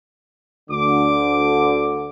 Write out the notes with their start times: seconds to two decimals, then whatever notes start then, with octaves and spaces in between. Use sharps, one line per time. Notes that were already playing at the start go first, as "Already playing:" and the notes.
0.70 D2 D3 D6